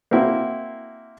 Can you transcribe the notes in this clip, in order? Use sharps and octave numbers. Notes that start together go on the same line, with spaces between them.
A#3 C4 E4 F#4